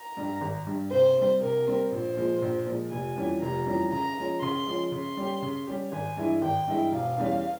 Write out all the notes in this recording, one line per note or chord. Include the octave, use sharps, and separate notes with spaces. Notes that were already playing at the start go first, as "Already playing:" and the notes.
Already playing: A#5
G2 G3
G#1
G2 G3
C3 C5
G3 C4
C3 A#4
G3 C4
A#1 C5
A#2 F3 G#3
A#1
A#2 F3 G#3
F1 G#5
F2 E3 G3 C#4
F1 A#5
F2 E3 G3 C#4
C#3 A#5
F3 G#3 C#4
C#3 C6
F3 G#3 C#4
C#3 C6
G3 C#4 G4
C#3
G3 C#4 G4
G#1 G#5
G2 E3 G#3 E4
G#1 G5
G2 E3 G#3 E4
E1 F5
E2 E3 G3 C#4